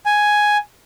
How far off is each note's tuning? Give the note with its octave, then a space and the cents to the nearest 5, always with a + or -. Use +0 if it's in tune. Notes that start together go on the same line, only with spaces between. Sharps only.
G#5 +5